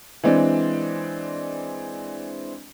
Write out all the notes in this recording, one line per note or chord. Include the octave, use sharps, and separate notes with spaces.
E3 G#3 C4 D4